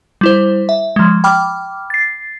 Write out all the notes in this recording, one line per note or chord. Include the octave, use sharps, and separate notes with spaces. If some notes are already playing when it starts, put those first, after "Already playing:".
G3 E4 C5
E5
F3 G#3
G5 B5 D6 F6
A6 C7